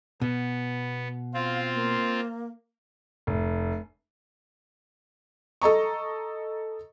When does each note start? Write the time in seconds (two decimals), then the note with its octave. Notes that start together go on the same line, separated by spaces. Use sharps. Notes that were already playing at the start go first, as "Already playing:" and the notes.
0.22 B2 B3
1.34 C4 F4 F5
1.74 A#3
3.27 F1
5.62 A4 D#5 A#5 C#6